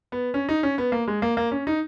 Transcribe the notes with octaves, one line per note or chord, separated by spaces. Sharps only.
B3
C#4
D#4
C#4
B3
A#3
G#3
A#3
A#3
C#4
D#4